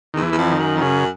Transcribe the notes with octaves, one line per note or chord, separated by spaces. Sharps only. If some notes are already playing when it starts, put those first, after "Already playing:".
E2 D#3
E3
E2
F2
D#3
F#2
F2
F#2 C#3